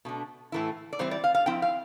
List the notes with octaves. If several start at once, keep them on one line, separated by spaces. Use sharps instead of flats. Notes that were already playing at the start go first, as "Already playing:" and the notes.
B2 A3 D4
A2 E3 A3 E4
D5
E3 G3 C4 E4 C5
D5
F5
F5
F3 C4 E4 G5
F5